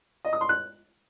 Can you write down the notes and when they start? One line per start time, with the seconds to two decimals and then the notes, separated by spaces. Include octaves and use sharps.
0.25 D#5
0.33 D#6
0.41 C6
0.49 F#6